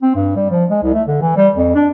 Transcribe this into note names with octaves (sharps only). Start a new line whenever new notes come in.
C4
G2
G3
F3
G#3
C2
A3
D3
E3
G3
F2
D4